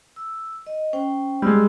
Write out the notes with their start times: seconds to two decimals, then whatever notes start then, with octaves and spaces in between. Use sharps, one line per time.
0.16 E6
0.67 D#5
0.93 C#4 C5 G5
1.42 G3 G#3 E6